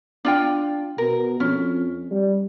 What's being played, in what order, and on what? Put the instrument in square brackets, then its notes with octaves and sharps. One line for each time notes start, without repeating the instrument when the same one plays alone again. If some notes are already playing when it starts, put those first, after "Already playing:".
[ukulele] D4 F4 G5
[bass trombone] B2 [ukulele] A#4
[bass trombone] F2 [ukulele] C#4
[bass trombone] G3